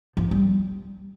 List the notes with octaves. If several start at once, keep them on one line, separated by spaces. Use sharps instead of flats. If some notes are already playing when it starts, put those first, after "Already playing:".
F3
G3